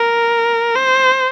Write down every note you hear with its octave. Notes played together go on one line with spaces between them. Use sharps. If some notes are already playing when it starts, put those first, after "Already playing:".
Already playing: A#4
C5